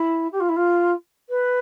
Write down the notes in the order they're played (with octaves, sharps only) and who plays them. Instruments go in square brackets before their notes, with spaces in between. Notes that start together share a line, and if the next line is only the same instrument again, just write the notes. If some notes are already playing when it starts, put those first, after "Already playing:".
Already playing: [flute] E4
G4
F4
E4
F4
B4